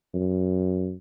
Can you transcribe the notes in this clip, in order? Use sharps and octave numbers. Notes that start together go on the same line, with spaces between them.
F#2